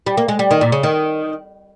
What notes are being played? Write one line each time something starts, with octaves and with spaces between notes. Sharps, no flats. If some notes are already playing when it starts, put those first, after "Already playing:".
G3
A#3
G#3
G3
D#3
A#2
C#3
D#3